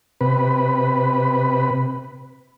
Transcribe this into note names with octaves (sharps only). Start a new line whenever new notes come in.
C3 B4